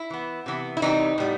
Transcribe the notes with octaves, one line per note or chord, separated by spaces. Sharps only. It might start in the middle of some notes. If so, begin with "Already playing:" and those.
Already playing: E4
E3 B3
C3 E3 B3
E4
C3 E3 G3 C4 D#4
A2 G3 B3